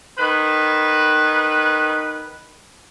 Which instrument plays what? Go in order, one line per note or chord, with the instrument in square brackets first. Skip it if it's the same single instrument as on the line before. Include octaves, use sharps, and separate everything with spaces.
[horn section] D#3 B4